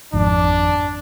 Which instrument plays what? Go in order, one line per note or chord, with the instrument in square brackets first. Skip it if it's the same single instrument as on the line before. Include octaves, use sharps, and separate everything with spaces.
[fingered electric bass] G#1 F2 [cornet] D4